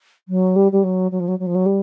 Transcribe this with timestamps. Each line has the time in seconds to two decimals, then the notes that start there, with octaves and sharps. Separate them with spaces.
0.28 F#3
0.56 G3
0.72 G3
0.84 F#3
1.11 F#3
1.20 F3
1.28 F#3
1.39 F#3
1.46 F3
1.55 F#3
1.66 G3